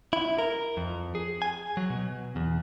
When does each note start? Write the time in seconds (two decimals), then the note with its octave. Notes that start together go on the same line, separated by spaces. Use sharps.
0.13 E4
0.38 A#4
0.77 F2
1.15 G#4
1.42 G#5
1.77 F#3
1.90 B2
2.36 E2